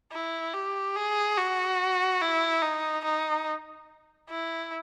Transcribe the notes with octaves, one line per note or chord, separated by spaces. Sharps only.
E4
G4
G#4
F#4
E4
D#4
D#4
E4